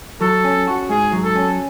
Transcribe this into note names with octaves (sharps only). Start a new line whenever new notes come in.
F#3 A4
C#4
F#4
G#2 G#4
F#3
A4
C#4